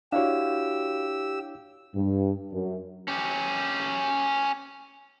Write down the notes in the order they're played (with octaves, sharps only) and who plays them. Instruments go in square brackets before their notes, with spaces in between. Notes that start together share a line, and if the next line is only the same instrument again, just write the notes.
[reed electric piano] D4 E4 C#5 [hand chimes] F#4 F5 [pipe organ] G4 E6
[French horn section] G2
F#2
[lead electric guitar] C#4 G4